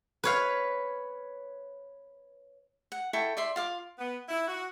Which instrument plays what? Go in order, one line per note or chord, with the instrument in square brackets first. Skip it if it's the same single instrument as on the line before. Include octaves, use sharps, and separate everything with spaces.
[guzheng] B4 C#5 F5
[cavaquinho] F#5
E4 A4 G5 C#6
D5 E5 C6
F4 F5 D6
[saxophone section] B3
E4
F#4